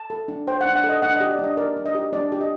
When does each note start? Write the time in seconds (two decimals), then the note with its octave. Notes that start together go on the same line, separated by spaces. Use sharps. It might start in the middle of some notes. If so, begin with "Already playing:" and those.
Already playing: A5
0.10 A4
0.28 D4
0.47 C5 G5
0.61 D4 F#5
0.76 F#5
0.84 A4
0.89 D#5
1.02 D4 F#5
1.17 G4 D#5
1.31 D5
1.39 D4 D#5
1.57 A#4 D5
1.77 D4
1.86 D#5
1.95 G4
2.13 D4 D5
2.32 G4
2.41 D#5